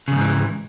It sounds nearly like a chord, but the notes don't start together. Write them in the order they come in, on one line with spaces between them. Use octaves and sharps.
C#3 E2 G#2 E3